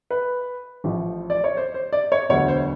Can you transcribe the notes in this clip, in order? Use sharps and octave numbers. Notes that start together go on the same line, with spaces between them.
B4
A1 A2 F3
D5
C#5
C5
C5
D5
C#5
E1 D2 D3 F#3 B3 C#5
C5